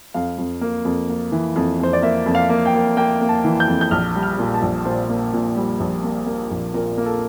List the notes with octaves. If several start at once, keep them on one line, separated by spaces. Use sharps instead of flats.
F2 F5
F2
A#3
F2
A#3
E3
F2
F2 C5
D5
A#3 E5
F2
F5
A#3
G5
A#3
A#3 G5
A#3
A5
E3
G6
F2
G6
A#1 F6
G3
F6
A#2
A5
A#1
A#2 C5
A#3
A#2
G3
A#1
A#3
A#3
A#1
A#2 A#4
A#3
A4